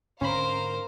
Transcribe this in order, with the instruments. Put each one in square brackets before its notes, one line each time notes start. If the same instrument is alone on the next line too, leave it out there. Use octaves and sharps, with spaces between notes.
[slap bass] G#2 D3 C4 [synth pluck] C#4 B5 [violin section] A#4 F5 [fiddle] C5